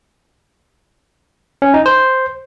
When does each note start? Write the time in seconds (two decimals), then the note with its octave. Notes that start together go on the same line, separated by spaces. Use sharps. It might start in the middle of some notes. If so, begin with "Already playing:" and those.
1.62 C#4
1.74 D#4
1.86 C5